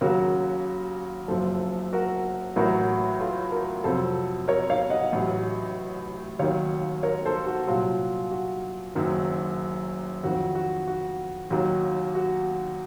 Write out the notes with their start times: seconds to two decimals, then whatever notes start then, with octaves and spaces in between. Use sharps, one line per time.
0.01 D#2 C#3 F#3 F#4 A#4
1.28 F#1 F#2 F3 A4 C5
1.93 F#4 A#4
2.56 A1 A2 F#3 F#4 A#4
3.21 F4 A4
3.52 F#4 A#4
3.84 F2 C3 F#3 A4 C5
4.48 A#4 C#5
4.70 C#5 F5
4.90 D#5 F#5
5.13 A1 A2 F#3
6.39 D#2 D#3 F#3 C#5 F5
7.03 A#4 C#5
7.26 A4 C5
7.46 F#4
7.67 C2 A#2 F#3 F4
8.31 F#4
8.95 F#1 F#2 D#3 F#3
10.23 F2 D#3 F#3 F#4
10.55 F#4
10.87 F#4
11.50 D#2 D#3 F#3
12.15 F#4